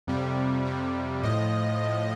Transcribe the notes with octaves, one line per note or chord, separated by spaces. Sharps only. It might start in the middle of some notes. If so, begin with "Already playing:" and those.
F2 C3 G3
F2 C3 G3
A2 F3 D#5
A2 F3